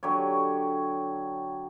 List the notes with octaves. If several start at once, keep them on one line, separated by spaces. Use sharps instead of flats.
D3 F#3 G4 C#5